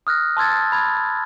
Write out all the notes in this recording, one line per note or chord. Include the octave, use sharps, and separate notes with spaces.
D#6 F6 F#6 A#6
A5 C6 E6 G#6 A6
A6
B5 G#6